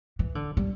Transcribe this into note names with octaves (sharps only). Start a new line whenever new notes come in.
E3
D3
G3